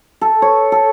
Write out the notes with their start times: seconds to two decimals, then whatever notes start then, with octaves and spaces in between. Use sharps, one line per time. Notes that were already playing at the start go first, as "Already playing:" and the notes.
0.21 A4
0.42 C#5
0.72 A4